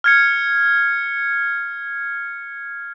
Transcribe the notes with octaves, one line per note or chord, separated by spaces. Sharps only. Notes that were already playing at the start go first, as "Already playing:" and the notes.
F6 G#6 C#7